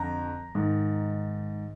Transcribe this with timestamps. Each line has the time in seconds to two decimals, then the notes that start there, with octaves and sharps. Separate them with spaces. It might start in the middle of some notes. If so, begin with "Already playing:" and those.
Already playing: F2 D3 A#5
0.55 G#2 D#3